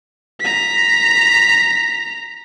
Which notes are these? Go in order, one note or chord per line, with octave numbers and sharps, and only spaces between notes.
A#5 B6